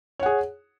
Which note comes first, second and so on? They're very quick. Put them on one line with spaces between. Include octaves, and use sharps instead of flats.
C#5 F#5 G#4